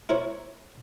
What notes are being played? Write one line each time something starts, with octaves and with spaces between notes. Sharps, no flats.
E4 A#4 C5 C#5